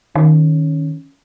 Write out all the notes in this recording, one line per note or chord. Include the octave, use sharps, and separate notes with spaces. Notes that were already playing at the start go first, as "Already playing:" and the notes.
D#3 C#4